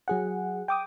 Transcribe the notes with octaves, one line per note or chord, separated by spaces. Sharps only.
F#3 G#4 F#5
G5 D6 D#6